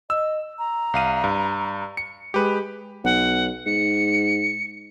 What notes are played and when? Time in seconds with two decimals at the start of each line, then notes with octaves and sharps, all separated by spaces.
0.10 D#5 E6
0.59 A#5
0.94 C2 F5 D#7
1.24 G2
1.97 C#7
2.34 G#3 G4 B4
3.04 B1 F#5
3.66 G#2 C#7